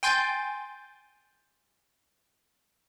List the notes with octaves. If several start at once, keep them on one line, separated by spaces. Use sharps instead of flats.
G5 G#5 C6 G6 A6